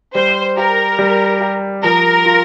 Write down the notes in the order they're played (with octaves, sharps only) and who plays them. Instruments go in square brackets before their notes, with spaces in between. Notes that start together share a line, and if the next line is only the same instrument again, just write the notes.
[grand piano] G3 [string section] C5
[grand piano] G4 [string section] A#4
[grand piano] G3
G4
[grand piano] F3 [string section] A#4
[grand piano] F4